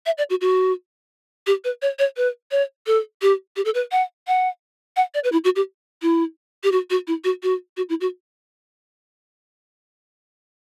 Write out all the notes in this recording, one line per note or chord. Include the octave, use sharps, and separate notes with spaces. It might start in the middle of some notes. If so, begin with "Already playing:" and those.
E5
D5
F#4
F#4
G4
B4
C#5
C#5
B4
C#5
A4
G4
G4
A4
B4
F#5
F#5
F#5
D5
B4
E4
F#4
G4
E4
G4
F#4
F#4
E4
F#4
F#4
F#4
E4
F#4